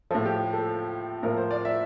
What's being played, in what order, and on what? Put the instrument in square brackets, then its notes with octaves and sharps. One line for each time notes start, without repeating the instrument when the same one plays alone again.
[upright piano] A2 F3 A4
G4
A4
A2 F3 A#4
C5
D5
E5